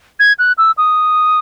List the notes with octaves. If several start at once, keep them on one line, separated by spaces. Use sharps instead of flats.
G#6
F#6
E6
D#6